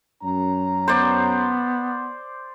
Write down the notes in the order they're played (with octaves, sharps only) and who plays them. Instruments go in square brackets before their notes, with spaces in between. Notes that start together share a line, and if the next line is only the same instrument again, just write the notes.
[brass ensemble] F#2 C#4 A#5
[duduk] B3 [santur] C5 D5